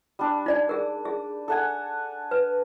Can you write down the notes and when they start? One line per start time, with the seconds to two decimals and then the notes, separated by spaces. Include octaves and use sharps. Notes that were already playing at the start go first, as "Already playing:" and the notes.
0.19 G3 D4
0.46 D#4 D5 G#5
0.69 G#4 A#4
1.05 G#4
1.48 A4 F#5 G#5
2.31 B4